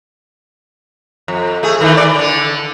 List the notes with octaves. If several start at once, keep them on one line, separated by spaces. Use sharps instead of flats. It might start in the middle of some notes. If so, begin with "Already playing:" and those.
F2
A3 G#4
D#3 E3 A3
D5
D3 D4